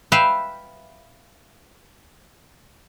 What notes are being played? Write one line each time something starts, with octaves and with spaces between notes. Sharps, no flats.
B4 E5 F5 G5